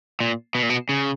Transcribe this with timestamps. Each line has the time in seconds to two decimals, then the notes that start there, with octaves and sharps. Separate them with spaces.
0.20 A#2
0.55 B2
0.63 A#2
0.70 B2
0.89 C#3